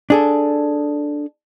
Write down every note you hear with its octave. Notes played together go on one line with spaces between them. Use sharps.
D4 G#4 A4